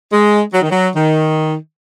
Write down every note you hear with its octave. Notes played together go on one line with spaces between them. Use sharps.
G#3
F#3
D#3
F#3
D#3